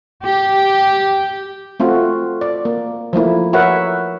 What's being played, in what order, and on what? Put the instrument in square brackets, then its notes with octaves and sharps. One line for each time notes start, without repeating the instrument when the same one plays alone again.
[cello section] G4
[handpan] A3 C4 F4 F#4
D5
A#3
F3 A3 A#3 E4
F#4 A#4 B4 C#5 E5 F#5